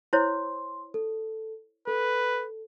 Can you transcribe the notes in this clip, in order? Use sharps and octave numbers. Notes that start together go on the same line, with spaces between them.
E4 C5 C#5 C6
A4
A4 B4